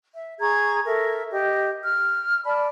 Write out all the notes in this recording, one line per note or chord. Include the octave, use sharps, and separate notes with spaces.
E5
G#4 A#5 C#6 G#6
A4 A#4 E5
G4 D#5
F6
D5 A5 B5